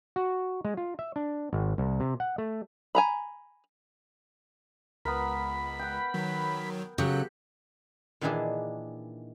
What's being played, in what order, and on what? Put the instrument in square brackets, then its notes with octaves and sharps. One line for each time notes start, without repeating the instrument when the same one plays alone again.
[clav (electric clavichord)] F#4
G#3
F4
E5
D4
G#1
C2
C3
F#5
A3
[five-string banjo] G#5 A#5 B5
[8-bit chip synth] C#2 [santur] B3 A#4 [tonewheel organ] B5
[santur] F#5 G5
[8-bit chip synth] D#3 F#3
[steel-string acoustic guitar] C#3 F#3 [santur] G4 [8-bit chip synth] A4 F#6
[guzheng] A#2 D#3 E3 D4 E4 G#4